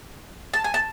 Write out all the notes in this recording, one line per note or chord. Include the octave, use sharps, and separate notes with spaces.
A5
G#5
A5